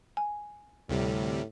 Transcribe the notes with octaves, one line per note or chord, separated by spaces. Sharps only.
G#5
D2 A2 C3 G3